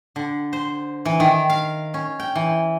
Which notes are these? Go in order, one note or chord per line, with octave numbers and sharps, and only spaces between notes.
D3
C5
E3
D#3
F5
C#4
G5
E3